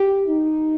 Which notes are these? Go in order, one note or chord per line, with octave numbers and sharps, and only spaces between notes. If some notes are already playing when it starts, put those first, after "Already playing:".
Already playing: G4
D#4